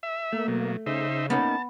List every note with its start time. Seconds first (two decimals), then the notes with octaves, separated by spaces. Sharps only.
0.03 E5
0.32 A3 A#3
0.48 B2 F#3
0.86 C#3 D#4 C5 E5
1.30 A#3 B3 C#4 D#4 A5